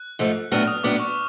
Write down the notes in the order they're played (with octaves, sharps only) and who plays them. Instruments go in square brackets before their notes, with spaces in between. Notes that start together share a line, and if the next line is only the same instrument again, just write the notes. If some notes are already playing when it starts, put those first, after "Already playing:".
Already playing: [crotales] F#6
[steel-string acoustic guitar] G#2 F3 A3
[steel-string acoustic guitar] A2 F#3 B3 D4 [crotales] F6
[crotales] D#6
[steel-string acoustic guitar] A2 F#3 B3 D4 [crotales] D6
[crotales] C#6